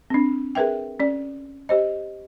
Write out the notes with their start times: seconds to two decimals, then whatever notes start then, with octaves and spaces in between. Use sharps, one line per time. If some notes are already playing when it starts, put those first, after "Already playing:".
0.10 C4 D4
0.55 G#4 A#4 B4 E5 G5
1.00 C#4 D5
1.69 G4 C5 D#5